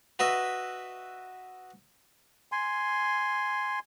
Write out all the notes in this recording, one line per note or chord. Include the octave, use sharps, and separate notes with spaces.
F#4 B4 D#5 E5
G#5 C6